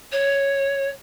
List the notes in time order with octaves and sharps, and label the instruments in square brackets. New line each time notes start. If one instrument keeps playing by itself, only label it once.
[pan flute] C#5